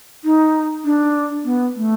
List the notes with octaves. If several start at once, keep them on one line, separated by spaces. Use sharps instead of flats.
D#4
D4
B3
A3